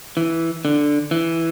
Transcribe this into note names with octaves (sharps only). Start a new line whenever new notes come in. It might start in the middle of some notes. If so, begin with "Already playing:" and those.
E3
D3
E3